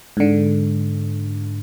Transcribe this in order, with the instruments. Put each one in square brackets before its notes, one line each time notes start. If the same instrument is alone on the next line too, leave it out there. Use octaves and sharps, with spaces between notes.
[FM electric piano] G#2 D3